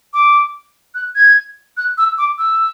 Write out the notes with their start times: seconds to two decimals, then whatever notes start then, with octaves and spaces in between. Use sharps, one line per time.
0.14 D6
0.95 F#6
1.15 G#6
1.77 F#6
1.98 E6
2.18 D6
2.38 E6